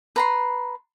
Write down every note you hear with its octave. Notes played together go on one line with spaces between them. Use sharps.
B4 A#5 C6